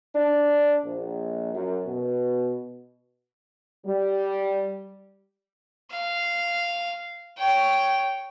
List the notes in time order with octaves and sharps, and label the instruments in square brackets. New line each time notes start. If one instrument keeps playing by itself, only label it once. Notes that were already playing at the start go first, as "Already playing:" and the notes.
[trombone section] D4
A#1
F#2
B2
[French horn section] G3
[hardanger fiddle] F5
C#5 G5